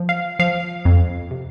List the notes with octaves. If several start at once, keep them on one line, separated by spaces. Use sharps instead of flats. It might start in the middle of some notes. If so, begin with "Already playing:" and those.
Already playing: F3
F5
F3 F5
F2
C3